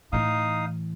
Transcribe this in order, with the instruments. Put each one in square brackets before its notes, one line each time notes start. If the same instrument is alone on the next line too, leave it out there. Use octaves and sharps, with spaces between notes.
[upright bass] A2 E3 [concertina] D#4 F5 D#6